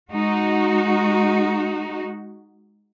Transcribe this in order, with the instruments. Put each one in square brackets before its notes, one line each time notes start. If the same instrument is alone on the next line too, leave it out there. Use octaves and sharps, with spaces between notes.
[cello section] G#3 D#4 F#4